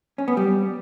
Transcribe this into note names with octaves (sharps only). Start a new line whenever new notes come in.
C#4
B3
G3